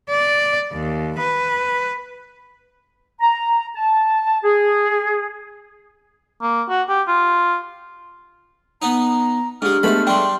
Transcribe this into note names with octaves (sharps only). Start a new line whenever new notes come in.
D5
D#2
B4
A#5
A5
G#4
A#3
F#4
G4
F4
B3 D#4 A#5
G#2 G#3 D4 G4 F6
G#3 A3 B3 A5 B5
G3 D4 G5 C6